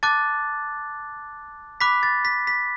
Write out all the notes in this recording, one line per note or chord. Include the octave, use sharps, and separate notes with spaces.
A5 D6 F#6 A6
B5 D6 F#6 B6
A6
B6
B6